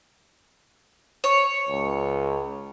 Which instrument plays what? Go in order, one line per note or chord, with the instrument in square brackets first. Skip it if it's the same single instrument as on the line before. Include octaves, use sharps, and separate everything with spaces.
[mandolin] C#5
[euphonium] C#2